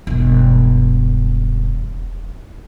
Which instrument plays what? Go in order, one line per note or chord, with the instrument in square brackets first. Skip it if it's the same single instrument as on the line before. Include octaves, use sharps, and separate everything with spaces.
[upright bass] E1 G2